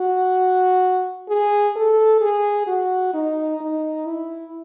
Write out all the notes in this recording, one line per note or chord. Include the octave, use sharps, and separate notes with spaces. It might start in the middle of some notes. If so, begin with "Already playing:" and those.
Already playing: F#4
G#4
A4
G#4
F#4
D#4
D#4
E4